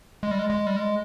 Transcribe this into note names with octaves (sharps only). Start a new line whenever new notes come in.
G#3
G3
G#3
G#3
G3
G#3